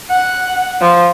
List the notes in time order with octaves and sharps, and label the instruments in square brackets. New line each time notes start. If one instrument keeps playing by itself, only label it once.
[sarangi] F#5
F3